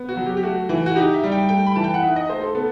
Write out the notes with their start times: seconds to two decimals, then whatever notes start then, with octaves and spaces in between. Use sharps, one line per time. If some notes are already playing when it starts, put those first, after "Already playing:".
Already playing: B3
0.09 F#4
0.17 F#3
0.26 G4
0.37 G4
0.43 A3 F#4
0.69 E3
0.86 F#4
0.96 D#4 G4
1.13 E5
1.23 G3
1.32 G5
1.49 A3 G5
1.66 B5
1.76 E3 A5
1.84 G5
1.94 F#5
2.03 D#4 E5
2.16 D#5
2.29 A3 C5
2.42 A4
2.55 B3 A4